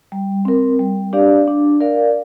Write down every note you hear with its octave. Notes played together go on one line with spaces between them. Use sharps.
G3
C4 A#4
G3
D4 G4 D5 F5
D4
A#4 D5 F5